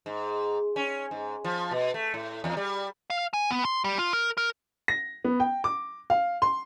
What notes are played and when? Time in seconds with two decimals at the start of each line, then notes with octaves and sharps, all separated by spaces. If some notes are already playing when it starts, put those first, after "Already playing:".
0.06 G#2
0.76 C#4
1.11 G#2
1.44 F3
1.71 B2
1.94 A3
2.14 A2
2.44 E2
2.57 G3
3.10 F5
3.33 G#5
3.51 B3
3.65 C6
3.84 G3
3.99 F4
4.13 A#4
4.37 A#4
4.88 A#6
5.25 B3
5.40 G5
5.64 D6
6.10 F5
6.42 C6